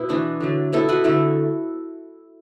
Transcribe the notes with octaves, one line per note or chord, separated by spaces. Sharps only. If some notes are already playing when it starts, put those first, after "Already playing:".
Already playing: B2 E4
E3 B3 D4 F#4
D3 F#3 A3
B2 B3 E4 A4
F#4 B4
D3 A3 E4 A4